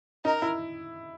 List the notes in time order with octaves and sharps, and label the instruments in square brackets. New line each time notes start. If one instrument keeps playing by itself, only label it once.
[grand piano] D#4 [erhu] A#4
[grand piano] E4